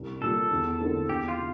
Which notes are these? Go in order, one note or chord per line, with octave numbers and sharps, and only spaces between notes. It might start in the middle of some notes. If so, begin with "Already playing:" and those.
Already playing: C2
A#2 G3 A4
E2
D3 A3 C4 E4
E2 G4
F4
C3